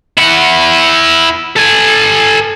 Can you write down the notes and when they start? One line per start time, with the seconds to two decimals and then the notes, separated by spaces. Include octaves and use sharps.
0.18 E4 F#5
1.57 A4 G#5